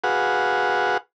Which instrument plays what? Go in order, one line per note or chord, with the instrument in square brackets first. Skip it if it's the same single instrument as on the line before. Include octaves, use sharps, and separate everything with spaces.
[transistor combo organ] F#4 G#4 B4 F5 F#5